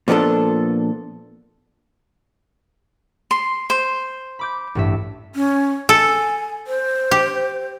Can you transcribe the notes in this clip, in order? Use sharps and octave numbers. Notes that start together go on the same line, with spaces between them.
A#2 F3 B3 D4 A4
C6
C5
B5 D6 G6
A1 G2 E5
C#4
A4 G#5
C5
G4